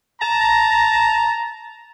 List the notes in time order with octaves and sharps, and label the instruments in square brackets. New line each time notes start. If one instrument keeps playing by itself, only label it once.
[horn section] A5 A#5